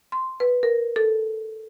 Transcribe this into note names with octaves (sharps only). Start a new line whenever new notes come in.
C6
B4
A#4
A4